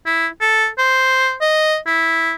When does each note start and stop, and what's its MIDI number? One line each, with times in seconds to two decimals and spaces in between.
0.06 0.27 64
0.41 0.67 69
0.78 1.34 72
1.41 1.77 75
1.87 2.34 64